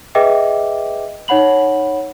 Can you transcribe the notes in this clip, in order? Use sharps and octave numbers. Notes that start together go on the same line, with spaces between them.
G#4 B4 D#5 E5 G5 D6
D#4 C#5 F#5 B5 F#7